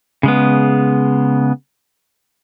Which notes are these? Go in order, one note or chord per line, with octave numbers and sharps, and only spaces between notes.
C#3 G#3 B3